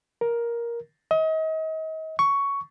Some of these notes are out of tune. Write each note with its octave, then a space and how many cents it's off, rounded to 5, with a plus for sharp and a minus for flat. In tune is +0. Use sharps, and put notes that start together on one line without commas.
A#4 +10
D#5 +35
C#6 +10